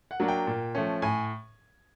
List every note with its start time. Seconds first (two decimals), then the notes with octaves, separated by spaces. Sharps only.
0.11 F#5
0.20 F#3 A#3 D4
0.28 G5
0.47 A#2
0.75 F3 A3 C#4
1.02 A2 G#5